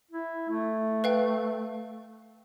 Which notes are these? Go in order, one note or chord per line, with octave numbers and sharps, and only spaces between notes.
E4
A3
B4 F5 G5